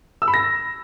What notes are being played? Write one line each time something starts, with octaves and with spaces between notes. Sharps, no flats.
E6
B5
A#6